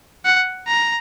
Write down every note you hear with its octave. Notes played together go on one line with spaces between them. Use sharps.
F#5
A#5